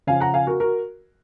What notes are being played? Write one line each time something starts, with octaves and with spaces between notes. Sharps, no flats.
C#3 F3 F5 G#5
F#5 A#5
F5 G#5
F#4 A#4
F#4 A#4